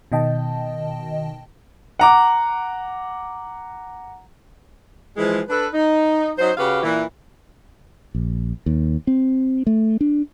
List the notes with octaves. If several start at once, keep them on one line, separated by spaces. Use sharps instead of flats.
B2 D#3 D#5 G5 A5
F#5 A#5 D6
E3 F3 G#3
D4 A4 B4
D#4
F#3 C#4 D#4 C5
C#3 F#4 G4 B4 F5
A#2 E3
A#1
D#2
C4
A3
D4